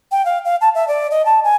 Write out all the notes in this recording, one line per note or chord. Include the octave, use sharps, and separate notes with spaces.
G5
F5
F5
A5
E5
D5
D#5
A5
G#5